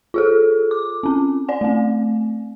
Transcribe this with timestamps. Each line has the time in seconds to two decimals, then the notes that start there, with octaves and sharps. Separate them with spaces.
0.14 F4 G#4 A4
0.71 D6
1.03 C4 C#4
1.49 D5 G#5
1.61 A3 C4